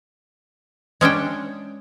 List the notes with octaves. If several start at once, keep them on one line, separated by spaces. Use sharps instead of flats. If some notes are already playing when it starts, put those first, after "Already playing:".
G#3 C#4 D4 G5